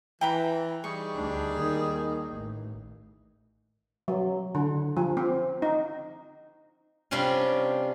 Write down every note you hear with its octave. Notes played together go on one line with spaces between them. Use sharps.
E3 G5 A#5 B5
G3 D#4 G#4 C#6
D2 D4
D#2 D#3
A1
F#3
D3
F3
C4
D#4
C3 G3 C#4 D4 F4